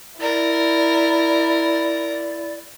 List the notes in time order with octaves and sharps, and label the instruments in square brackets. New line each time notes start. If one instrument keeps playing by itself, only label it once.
[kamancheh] E4 [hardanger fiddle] A#4 [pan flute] D5